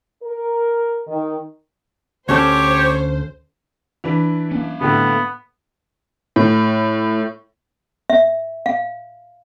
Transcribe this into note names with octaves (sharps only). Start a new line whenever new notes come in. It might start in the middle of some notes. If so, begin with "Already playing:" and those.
A#4
D#3
D2 C#4 G4 A4 C5 C#5
E3 D4 B4
A#3 C#4
A2 D3 B3
A2
E5
F5